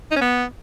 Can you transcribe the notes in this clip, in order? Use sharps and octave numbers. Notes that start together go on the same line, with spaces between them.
D#4
C#4
B3